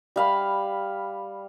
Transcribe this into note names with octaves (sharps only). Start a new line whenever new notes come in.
G3 F5 B5